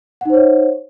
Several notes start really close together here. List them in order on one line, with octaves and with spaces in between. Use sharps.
F#5 D#4 C5 C#5 E5